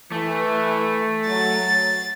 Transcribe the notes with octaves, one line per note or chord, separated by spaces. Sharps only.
E3 A3
F#3 A6